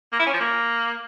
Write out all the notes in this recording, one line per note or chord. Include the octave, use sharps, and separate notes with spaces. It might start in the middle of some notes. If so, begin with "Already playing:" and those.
A#3
E4
C#4
F3
A#3